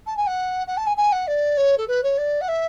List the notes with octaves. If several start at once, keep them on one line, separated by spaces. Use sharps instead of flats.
A5
G#5
F#5
F#5
A5
G#5
G#5
F#5
D5
C#5
A4
B4
C#5
D5
F#5
E5